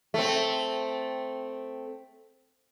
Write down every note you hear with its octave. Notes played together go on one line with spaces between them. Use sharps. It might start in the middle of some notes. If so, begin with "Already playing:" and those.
A3 C4